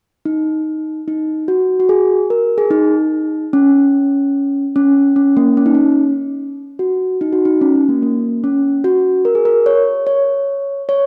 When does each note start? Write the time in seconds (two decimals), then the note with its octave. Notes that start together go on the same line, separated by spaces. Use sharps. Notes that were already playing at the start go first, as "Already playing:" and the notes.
0.25 D#4
1.08 D#4
1.48 F#4
1.80 F#4
1.89 G#4
2.30 A#4
2.58 G#4
2.71 D#4
3.53 C#4
4.76 C#4
5.16 C#4
5.37 A#3
5.57 C#4
5.66 D#4
5.75 C#4
6.79 F#4
7.21 D#4
7.33 F#4
7.45 D#4
7.61 C#4
7.75 C#4
7.89 A#3
8.02 A#3
8.44 C#4
8.84 F#4
9.25 A#4
9.35 G#4
9.45 A#4
9.66 C#5
10.07 C#5
10.89 C#5